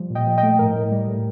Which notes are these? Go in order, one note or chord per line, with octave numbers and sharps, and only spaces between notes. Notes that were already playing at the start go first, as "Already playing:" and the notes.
Already playing: F3 G3
A#2
D#5 G5
F3
D#5 G5
A3
A2 A#4
A2
G3
A2